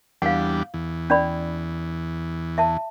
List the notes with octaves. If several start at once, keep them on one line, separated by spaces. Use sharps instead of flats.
E2 G3 D4 F5 F#5
E2
C#4 D5 B5
E5 A5